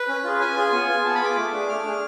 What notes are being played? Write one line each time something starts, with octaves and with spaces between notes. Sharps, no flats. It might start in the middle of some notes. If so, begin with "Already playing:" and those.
Already playing: B4
C#4
F4 G#4
C#4 G#5
F4 G#4
B3
F4 G#4
B3 A5
B5
F4 G#4 D6
A3
D4 G#4
A3 F6
D4 G#4